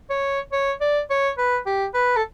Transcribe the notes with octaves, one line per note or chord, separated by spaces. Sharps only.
C#5
C#5
D5
C#5
B4
G4
B4
A4